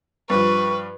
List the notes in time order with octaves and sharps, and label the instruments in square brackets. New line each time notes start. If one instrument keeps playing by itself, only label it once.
[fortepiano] G2 F3 [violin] B4 [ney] C#6